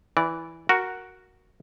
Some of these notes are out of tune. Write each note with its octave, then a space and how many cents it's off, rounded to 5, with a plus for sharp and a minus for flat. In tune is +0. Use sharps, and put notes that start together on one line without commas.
E3 +0 D5 -15
F#4 +0 A#4 +0